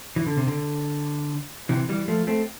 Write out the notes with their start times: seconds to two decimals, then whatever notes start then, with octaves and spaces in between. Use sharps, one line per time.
0.16 E3
0.27 D3
0.37 C3
0.47 D3
1.69 C3 E3
1.89 E3 G3
2.08 F3 A3
2.27 A3 C4